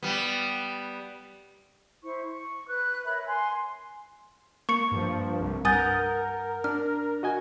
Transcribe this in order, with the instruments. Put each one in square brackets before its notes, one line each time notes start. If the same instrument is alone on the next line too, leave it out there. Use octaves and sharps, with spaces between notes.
[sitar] G3 B3
[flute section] E4 C5 C#6
C#6
B4 F#6
A#4 C#5 E5 B5
G#5 C6
[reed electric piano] A#3 [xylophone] C#6 C#7
[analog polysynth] G2 F3
C2
[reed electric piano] G2 F#5 G6 [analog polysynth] A#4 [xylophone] G#5 D#6 A6
[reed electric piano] D4 [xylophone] F6
[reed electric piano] F#4 D#5 G#5